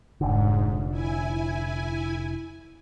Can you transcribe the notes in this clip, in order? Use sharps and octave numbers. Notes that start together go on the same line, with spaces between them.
F1 G#2 D3
E4 G#5